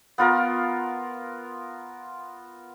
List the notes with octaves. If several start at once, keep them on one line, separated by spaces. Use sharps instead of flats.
B3 F4 A#4